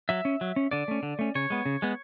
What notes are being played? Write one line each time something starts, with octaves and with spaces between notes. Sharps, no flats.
F#3 E5
C#4
F#3
C#4
D3 D5
A3 C#4
D3
A3 C#4
C#3 C#5
G#3 B3
C#3
G#3 B3